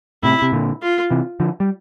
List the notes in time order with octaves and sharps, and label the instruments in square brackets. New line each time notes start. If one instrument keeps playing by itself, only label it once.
[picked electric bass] A2 C3 [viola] E4
[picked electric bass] C3
A#2 D3
[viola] F4
[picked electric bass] C3 E3
D3 F3
G3